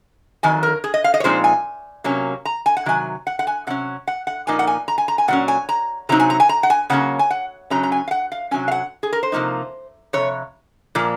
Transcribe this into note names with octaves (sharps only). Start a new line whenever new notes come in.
F2 D#3 F#3 G#5
A#4
G#4
D#5
F5
D#5
C#5
A#2 F3 G#3 C4 D#4 C5
G#5
C3 F#3 A#3 C#4
A#5
G#5
F#5
C3 D#3 F#3 G#5
F#5
F#5
G#5
C3 F#3 C#4 F#5
F#5
F#5
A#2 F3 A#3 D#4 G#5
F#5
G#5
A#5
G#5
A#5
G#5
A#2 F#3 C#4 F#5
G#5
A#5
C3 F#3 C4 D#4 A#5
G#5
A#5
G#5
A#5
F#5
G#5
C#3 F#3 A#3 C#4 F#5
G#5
F#5
F#2 C#3 F#3 C#4 A#5
A#5
G#5
F5
F#5
F5
C3 F#3 C#4 G#5
F5
F#5
G#4
A#4
C5
C3 F3 A#3 D#4
F2 C3 C#5
A#2 F3 A#3